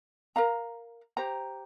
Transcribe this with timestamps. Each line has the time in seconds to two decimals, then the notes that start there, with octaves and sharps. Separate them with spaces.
0.36 A#4 F5 A#5
1.17 G4 C5 A#5